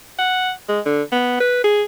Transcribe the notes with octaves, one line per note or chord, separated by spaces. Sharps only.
F#5
G#3
D3
B3
B4
G#4